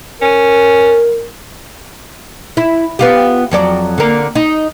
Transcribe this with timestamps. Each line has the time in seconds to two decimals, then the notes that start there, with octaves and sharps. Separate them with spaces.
0.21 C#4 A#4
2.57 E4
2.99 B3 F4 G4
3.51 F2 F#3 D5
3.98 D3 A#3
4.35 D#4